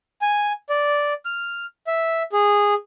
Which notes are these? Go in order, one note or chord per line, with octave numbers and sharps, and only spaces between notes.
G#5
D5
F6
E5
G#4